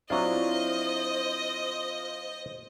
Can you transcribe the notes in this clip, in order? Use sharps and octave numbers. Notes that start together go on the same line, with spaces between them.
F#3 C4 D4 E4 F4 C5 D#5